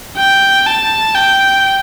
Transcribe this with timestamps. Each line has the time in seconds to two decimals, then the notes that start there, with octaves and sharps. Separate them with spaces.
0.17 G5
0.67 A5
1.15 G5